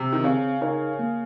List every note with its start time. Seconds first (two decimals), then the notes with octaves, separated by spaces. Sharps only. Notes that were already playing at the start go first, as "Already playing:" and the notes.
Already playing: C3
0.13 D#3
0.23 C#3 C4
0.61 C#3 D#4 A#4 C#5 F5
0.99 A#3